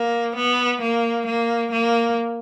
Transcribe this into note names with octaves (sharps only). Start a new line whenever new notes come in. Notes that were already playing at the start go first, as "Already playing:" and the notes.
Already playing: A#3
B3
A#3
A#3
A#3